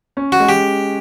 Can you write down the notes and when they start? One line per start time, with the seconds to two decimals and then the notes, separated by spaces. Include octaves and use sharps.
0.17 C#4
0.32 F#4
0.40 G#3
0.49 G4